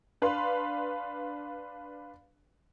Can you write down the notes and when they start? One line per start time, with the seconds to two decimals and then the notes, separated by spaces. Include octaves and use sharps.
0.22 D4 B4 F5 C6